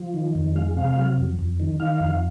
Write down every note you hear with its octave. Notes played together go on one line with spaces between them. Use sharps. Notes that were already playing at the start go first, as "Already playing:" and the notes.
Already playing: F3
D#3
F2
G#3 F5
C3 F5
F#3
F2
F2
D#3
D#3 F5
F2